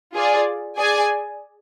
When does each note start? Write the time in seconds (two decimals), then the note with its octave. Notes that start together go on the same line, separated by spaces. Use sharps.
0.14 F4 G#4 D5
0.78 G#4 D5 G#5